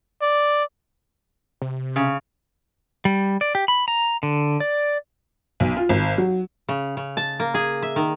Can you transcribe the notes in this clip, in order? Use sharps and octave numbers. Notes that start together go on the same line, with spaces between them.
D5
C3
C#3
G3
D5
G4
B5
A#5
D3
D5
B1
F4
G#1
F#3
C#3
C#3
A5
A#3
G#4
E5
D#3